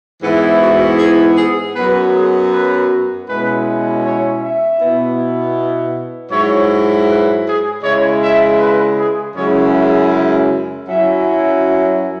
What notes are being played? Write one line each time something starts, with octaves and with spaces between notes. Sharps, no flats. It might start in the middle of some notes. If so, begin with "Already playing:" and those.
G#2 E3 B3 E4
F#4
G#4
G#4
F#2 F#3 B3 B4
G#4
B4
B2 G#3 C#4 E4 B4
C#5
E5
B2 B3 E4
G#2 F#3 E4 C#5
B4
G#4
C#3 G#3 E4 C#5
E5
B4
G#4
F#2 C#3 G#3 E4 C#5
E5
F#2 F#3 C#4 E4 E5